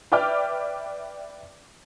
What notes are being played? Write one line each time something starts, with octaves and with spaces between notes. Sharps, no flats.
B4 D5 E5 G5 D6 F6